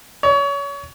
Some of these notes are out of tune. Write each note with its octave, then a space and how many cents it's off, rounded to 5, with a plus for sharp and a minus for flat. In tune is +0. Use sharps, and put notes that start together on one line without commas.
C#5 +30